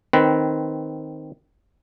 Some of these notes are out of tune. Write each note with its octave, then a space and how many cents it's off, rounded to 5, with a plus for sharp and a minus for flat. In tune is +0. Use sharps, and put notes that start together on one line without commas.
D#3 +0 C4 +0 B4 +5